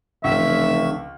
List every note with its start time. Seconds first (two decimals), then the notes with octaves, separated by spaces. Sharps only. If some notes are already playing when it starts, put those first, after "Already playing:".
0.24 F1 C#2 E3 D4 E5 C#6